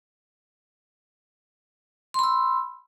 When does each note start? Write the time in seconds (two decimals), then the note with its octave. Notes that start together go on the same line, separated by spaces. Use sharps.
2.14 C6
2.19 B5
2.24 E6